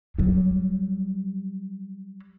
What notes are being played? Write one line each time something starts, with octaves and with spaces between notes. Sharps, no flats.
F#3 G3